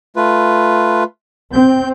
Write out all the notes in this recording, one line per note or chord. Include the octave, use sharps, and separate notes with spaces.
A3 F4 B4
C4 G6